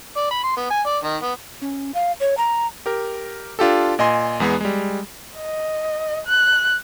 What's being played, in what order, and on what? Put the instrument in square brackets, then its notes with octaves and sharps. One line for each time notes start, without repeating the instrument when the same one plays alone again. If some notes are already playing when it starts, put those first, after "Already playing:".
[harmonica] D5
B5
C6
B3
G#5
D5
D#3
B3
[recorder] C#4
F5
C#5
A#5
[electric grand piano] G4 A#4
D4 F4 G4 A4
A#2 D#5 G#5 C6
E2 G#3 B3
G3 G#3
[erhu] D#5
F#6